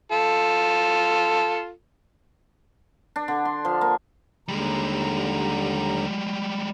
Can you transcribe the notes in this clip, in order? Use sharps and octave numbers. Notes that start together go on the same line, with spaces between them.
F4 A4
D4
D3
C6
F3
A#3
D#2 D3 G3 G#3 A#5